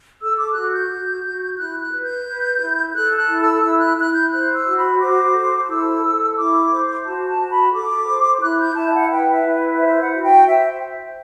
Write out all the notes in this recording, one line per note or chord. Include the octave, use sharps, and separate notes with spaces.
A4 E6
D6
F#4 F#6
G6
F#4
F#4
E4 F#6
F#6
B4
G6
B4
E4
A4 F#6
F#6
E4
E6
E4 E6
F#6
E4 F#6
G6
C5 F#6
E6
F#4
B5
C5 D6
A4
E4 E6
A4
E4 D6
C5
F#4 A5
A5
F#4
B5
A4 D6
C5
E4 F#6
G6
E4 A5
E5
F#5
B4 G5
E5
E4
C5 E5
F#5
F#4
G5
C5 E5